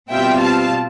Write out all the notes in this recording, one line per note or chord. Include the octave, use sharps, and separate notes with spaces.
B2 G3 C4 F4 E5 G5
F5 A5